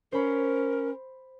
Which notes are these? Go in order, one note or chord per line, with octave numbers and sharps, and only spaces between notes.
C#4 A#4 C5 B5